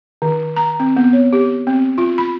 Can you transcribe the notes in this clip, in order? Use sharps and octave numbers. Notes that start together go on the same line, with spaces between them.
D#3
A#5
C4
B3
C#5
G4
C4
F4
B5